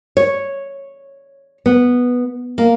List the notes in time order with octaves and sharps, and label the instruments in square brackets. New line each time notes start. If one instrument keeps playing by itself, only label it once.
[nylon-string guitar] C#5
B3
A#3